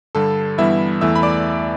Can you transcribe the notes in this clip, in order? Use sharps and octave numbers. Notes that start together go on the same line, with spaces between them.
G2 D3 G3 A4 A5
G2 E3 G3 B3 E4 E5
E2 E3 A3 E5 E6
B5
D5 D6